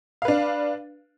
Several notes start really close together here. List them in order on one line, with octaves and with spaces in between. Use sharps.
F5 B4 D4